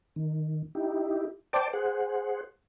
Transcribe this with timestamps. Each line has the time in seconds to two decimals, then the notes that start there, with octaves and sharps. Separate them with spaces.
0.16 D#3
0.75 D#4 E4 G4
1.53 C5 D5 G5 A5 D6
1.73 G#4 C5 F#5